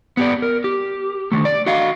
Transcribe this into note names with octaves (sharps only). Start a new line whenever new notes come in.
B3 G4 D5
A#4
G4
D3 D#3 A3
D5
F#4 D#5 F5